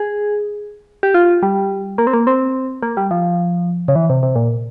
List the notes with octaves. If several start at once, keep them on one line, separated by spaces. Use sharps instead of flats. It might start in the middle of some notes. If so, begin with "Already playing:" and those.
Already playing: G#4
G4
F4
G3
A#3
C4
A#3
C4
A#3
G3
F3
C#3
E3
C3
C3
A#2